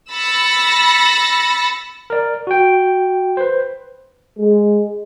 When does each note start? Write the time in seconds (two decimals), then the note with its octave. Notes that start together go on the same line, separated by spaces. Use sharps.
0.11 B5 E6 A6 A#6 C#7
2.10 A#4 D5
2.47 F#4 G5
3.37 B4 C5
4.39 G#3